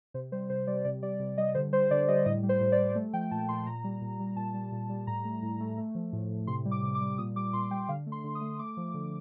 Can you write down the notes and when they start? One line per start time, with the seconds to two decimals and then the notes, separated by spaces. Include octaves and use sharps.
0.14 C3 C5
0.32 G3 C5
0.50 C3 C5
0.67 G3 D5
0.85 C3 D5
1.02 G3 D5
1.20 C3
1.38 G3 D#5
1.55 D3 C5
1.72 G3 C5
1.91 D3 D5
2.08 G3 D#5
2.26 A2 D#5
2.43 G3
2.49 C5
2.60 A2
2.72 D5
2.79 G3
2.95 A3
3.13 F3 G5
3.31 A#2 A5
3.48 A#2 C6
3.66 A#2 A#5
3.84 G3
4.01 A#2
4.20 G3
4.36 A#2 A5
4.54 G3
4.72 A#2
4.89 G3
5.07 A2 A#5
5.25 A3
5.42 A2
5.60 A3
5.78 A3
5.95 F3
6.13 A2
6.30 A2
6.47 C3 C6
6.65 G3
6.71 D6
6.83 C3
6.95 D6
7.01 G3
7.18 A#2 D#6
7.36 G3 D6
7.53 A#2 C6
7.71 G3 G5
7.89 D3 F5
8.07 A3
8.12 C6
8.24 D3
8.35 D#6
8.41 A3
8.59 A3 D6
8.77 F3
8.94 D3